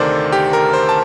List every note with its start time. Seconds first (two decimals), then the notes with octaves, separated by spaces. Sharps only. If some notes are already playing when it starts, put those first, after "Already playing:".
Already playing: D2 C3 D#3 A4 A#4 C5 D5
0.32 G4
0.53 A#4
0.73 C5
0.89 A5